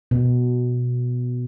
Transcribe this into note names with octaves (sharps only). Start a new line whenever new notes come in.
B2